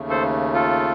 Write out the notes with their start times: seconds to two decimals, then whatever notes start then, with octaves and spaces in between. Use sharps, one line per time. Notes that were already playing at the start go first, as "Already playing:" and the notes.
Already playing: D#2 C#3 A3
0.10 A4 C5
0.54 F4 A4